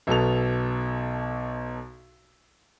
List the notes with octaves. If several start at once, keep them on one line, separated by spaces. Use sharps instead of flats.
B1 B2 A4 F7